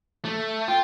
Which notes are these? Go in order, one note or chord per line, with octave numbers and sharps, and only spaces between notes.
A3
F4 G5